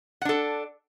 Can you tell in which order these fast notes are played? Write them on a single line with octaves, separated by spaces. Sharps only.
F#5 D4 A4